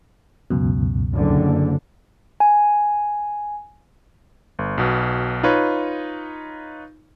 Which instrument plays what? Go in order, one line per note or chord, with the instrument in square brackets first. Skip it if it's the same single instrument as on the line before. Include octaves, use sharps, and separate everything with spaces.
[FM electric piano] C#2 F#2 B2
[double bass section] F#1 D3
[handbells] G#5
[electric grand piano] G1
B1 B2
D#4 F4 B4 C#5